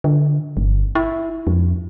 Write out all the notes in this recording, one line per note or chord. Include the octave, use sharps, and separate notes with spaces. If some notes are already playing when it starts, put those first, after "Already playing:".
D3
G1
E4
F2